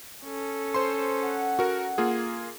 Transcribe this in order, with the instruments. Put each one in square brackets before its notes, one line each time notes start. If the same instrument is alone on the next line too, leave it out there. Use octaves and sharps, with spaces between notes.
[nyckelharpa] C#4 A4
[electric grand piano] C5 C6
[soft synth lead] F#5
[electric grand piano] F#4 A#4
A#3 F4 G#4